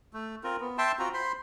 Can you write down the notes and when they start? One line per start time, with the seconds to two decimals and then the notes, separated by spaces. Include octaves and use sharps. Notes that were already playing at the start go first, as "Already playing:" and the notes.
0.13 A3
0.44 C4 F4 A#4
0.60 B3
0.78 E5 G5 A5 C6
0.99 C4 F4 F#4 A#5
1.14 C5 B5 C6